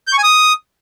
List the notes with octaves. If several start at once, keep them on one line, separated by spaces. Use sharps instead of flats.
G6
C#6
G#5
D#6